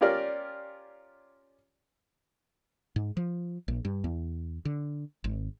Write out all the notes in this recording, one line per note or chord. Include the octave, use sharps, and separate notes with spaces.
C#4 F4 G4 A#4 D5
G#2
F3
A#1
G2
E2
D3
G#1